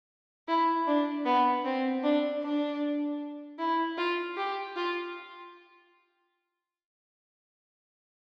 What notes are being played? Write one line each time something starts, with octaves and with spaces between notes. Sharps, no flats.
E4
D4
B3
C4
D4
D4
E4
F4
G4
F4